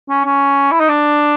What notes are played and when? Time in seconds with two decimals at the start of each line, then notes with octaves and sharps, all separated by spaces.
0.09 C#4
0.25 C#4
0.72 E4
0.80 D#4
0.89 D4